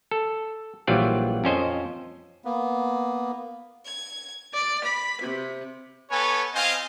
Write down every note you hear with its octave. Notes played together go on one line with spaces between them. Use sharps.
A4
A#1 E3 F#3 G3 F4 D5
F2 C#4 C5 D#5
A#3 B3
G#6
D5
B5
C3
B3 A4 B4 C#5 G#5
C4 F4 C5 D#5 F5 G#5